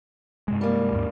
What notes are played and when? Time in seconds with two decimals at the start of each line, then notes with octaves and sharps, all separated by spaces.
0.48 G2 C3 G#3
0.61 G3 A#3
0.93 D#2 G#2